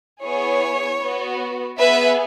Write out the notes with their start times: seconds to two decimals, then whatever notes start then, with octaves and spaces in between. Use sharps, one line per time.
0.24 B3 E4 G#4 C#5
1.02 B3
1.07 F#4
1.80 B3 G#4 B4 E5